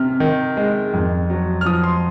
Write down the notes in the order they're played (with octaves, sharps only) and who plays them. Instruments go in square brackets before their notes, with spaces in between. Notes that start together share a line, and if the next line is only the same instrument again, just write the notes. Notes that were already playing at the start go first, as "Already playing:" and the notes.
Already playing: [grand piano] C3 F6
D#3
G#3
F2
F#3
F6
F3 D#6
C6